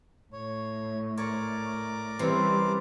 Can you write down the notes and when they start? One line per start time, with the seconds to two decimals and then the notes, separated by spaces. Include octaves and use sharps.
0.33 A2 C#5
1.18 A#4 C#5 D5 D6
2.19 C3 E3 G3 C4 C#4